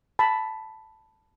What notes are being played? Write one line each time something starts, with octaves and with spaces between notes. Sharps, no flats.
A5 B5